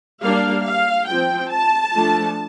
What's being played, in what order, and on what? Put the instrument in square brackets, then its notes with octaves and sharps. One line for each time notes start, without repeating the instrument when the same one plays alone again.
[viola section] G3 A#3 D4 F5
F5
F3 C4 G5
A5
F3 A3 D4